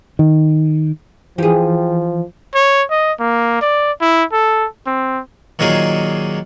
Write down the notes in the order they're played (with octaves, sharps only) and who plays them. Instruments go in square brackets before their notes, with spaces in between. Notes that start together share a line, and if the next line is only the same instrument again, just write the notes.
[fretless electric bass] D#3
[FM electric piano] E3 [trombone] F3 [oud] G4 G#4
[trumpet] C#5
D#5
A#3
D5
E4
A4
C4
[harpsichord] A#2 D#3 F#3 A#3 G#4